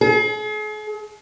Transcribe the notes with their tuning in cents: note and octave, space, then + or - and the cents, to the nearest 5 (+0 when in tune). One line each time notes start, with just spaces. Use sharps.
G#4 +40